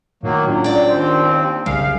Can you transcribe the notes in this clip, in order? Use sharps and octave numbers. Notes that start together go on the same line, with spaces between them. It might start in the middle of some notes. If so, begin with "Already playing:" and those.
A2 D#3 F#3 A#3
F#3 C#4 D4 F4
D5 G5
D#2 C4
B1 F#2 C#3 G3 F5